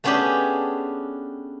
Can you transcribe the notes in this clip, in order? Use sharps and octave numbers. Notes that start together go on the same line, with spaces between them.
A3 B3 C#4 D4 G4 G#4